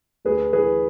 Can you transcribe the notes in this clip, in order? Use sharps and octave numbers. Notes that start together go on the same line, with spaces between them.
D2 G#4 B4
E3 G#4 B4